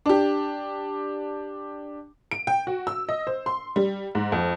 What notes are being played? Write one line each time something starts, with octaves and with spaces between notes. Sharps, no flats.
D4 G4
D7
G5
F#4
E6
D#5
C5
C6
G3
G#2
F2